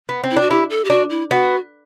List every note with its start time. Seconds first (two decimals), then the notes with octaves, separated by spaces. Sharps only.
0.09 B3
0.24 C4
0.31 E4
0.36 D4 F#4
0.50 E4 G4
0.70 A4
0.85 G4
0.90 D4 F#4
1.10 E4
1.31 B3 F#4